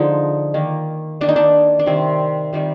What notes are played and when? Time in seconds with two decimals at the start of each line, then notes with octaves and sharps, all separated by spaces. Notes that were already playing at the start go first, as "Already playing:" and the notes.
Already playing: D3 F3 G#3 D#4
0.54 D#3 A#3
1.21 D#3 A#3 D4
1.29 D#4
1.36 D4
1.79 D4
1.86 C3 D#3 G3 C4
2.53 C3 D#3 G3